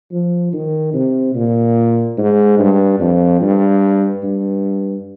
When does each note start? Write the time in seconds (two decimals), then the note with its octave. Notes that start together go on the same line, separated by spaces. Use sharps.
0.11 F3
0.53 D#3
0.93 C3
1.35 A#2
2.18 G#2
2.59 G2
3.00 F2
3.41 G2
4.23 G2